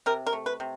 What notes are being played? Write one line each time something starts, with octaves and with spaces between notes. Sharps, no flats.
C3 A#4
A#4
A3
B4
C3